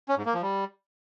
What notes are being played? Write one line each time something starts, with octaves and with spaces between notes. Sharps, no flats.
C#4
G#2
A#3
F3
G3